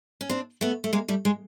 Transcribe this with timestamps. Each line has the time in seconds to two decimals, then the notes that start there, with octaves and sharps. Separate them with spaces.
0.21 C#4
0.29 C4 D4
0.61 A3 B3
0.84 A3
0.93 G#3 A#3
1.08 G3 A3
1.25 G#3